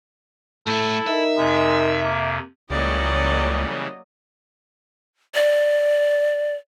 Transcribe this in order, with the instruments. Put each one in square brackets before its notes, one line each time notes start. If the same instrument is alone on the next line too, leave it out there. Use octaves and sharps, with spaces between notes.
[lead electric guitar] A2 A3 [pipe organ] E4 [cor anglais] A4
[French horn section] D#4 A#4 [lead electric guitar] E5
[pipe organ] F2 C3 [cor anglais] G#3
[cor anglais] A#3
[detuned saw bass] C#2 [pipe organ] C#3 E3 G3 [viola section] F#3 A#3 D#5 [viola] D5
[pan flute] D5